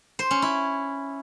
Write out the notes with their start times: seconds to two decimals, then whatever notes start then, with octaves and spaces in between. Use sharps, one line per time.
0.19 C5
0.31 C#4
0.42 E4